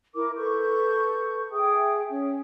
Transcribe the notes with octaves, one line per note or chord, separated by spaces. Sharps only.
E4 A#4 D6
A4 B4 C#6 G6
G#4 E5 G5 D#6
C#4